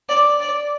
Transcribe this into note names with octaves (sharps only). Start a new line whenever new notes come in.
D5
D5